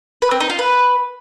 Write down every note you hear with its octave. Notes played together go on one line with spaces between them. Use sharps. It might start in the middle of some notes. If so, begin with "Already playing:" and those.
B4
C4
D#4
F4
B4